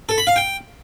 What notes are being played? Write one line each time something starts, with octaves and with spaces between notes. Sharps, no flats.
A4
B5
F5
G5